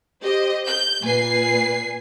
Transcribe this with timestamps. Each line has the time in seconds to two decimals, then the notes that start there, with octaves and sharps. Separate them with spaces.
0.23 G4 C5 D#5
0.66 G6
1.02 A#2 B4 G#5 C7